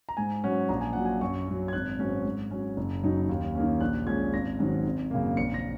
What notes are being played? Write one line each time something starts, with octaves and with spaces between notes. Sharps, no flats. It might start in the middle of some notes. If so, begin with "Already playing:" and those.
A#5
G#2 G#5
F#3 C#4 F#5
A#1 A#5
G#5
A#2 F#3 F#5
G#5
F#2 C#6
F#3 C#4
G#6
G#1 F#6
G#2 F#3 C#4
G#2
F#3 C#4
F#1
F#2 F#3 D#4
D#2
D#3 A#3 C#4
A#1 F#6
A#2 G#3 C#4 G#6
G#1 A#6
G#2 D#3 F#3 C#4
G#1
F#2 C#3 A#3
A#1 C#7
A#6